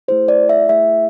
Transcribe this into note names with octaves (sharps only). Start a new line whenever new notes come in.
A3 E4 G#4 C5
D5
E5
A3 E4 G#4 E5